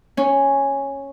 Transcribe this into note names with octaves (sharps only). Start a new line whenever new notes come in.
C#4